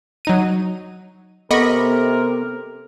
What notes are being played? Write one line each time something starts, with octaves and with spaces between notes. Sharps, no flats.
F#3 D#4 D#7
C3 B3 A4 A#4 D#5 B5 C#6 A#6